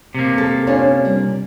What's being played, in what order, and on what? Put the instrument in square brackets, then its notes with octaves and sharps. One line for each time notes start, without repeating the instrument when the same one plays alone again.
[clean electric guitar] C3 A#3
[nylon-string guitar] A4
C#4 D4 F4
G3